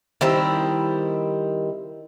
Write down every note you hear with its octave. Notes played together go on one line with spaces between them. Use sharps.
D#3 G3 C4 E4